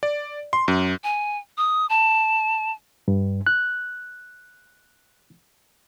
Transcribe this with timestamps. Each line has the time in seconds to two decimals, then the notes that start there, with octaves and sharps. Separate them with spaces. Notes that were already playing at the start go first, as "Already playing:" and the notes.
0.03 D5
0.53 C6
0.68 F#2
1.04 G#5
1.57 D#6
1.89 A5
3.08 G2
3.47 F#6